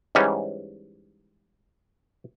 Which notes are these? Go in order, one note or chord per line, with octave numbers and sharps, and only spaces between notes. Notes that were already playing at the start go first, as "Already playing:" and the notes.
G#2 E3 G3 C#4